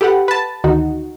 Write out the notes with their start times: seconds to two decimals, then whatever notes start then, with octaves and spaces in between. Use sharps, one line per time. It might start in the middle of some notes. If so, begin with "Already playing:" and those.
0.01 G4 A4 B4 F#5
0.28 B4 A5
0.64 D2 D#3 D#4 F#4